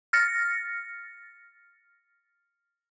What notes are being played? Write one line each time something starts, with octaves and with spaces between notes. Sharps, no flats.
F6 A6 A#6 C#7